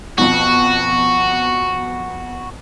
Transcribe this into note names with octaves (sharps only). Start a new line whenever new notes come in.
F2 B2 F#4